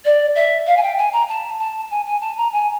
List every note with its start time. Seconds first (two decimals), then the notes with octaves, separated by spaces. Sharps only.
0.05 D5
0.35 E5
0.67 F5
0.77 G#5
0.83 G5
0.98 G#5
1.13 A#5
1.29 A5
1.60 A5
1.91 G#5
2.06 G#5
2.21 A5
2.37 A#5
2.53 G#5